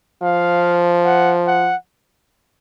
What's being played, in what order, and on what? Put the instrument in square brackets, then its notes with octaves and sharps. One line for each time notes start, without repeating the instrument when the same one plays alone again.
[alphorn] F3 [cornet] F5
[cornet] F#5
F#5